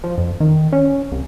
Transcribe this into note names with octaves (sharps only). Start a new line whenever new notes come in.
F3
F2
D#3
C#4
C2